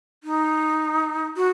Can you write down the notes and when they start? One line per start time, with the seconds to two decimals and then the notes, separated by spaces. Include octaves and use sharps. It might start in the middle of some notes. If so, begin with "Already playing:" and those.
0.24 D#4
1.36 F#4